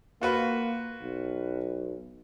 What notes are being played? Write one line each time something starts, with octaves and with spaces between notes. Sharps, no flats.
A#3 F4 F#4 B4
B1